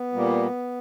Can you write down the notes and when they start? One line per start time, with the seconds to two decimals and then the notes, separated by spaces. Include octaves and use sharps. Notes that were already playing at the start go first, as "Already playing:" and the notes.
Already playing: B3
0.13 A#2 G3 A#3